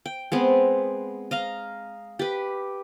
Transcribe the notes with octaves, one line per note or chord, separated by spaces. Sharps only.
G5
G#3 B3 C4
D#5 F5 A#5
G4 B4